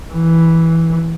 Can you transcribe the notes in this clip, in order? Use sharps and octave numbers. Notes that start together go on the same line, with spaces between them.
E3